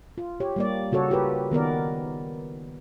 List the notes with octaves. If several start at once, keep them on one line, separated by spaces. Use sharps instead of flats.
F4
G4 C#5
G3 A#3 D5
C#3 F#4 A4 C#5
F4 G4 A#4 B4
D#3 B3 A#4 D5